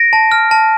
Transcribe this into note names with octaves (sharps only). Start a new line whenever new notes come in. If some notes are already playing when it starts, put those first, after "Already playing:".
Already playing: A#6 D7
A5
F6
A5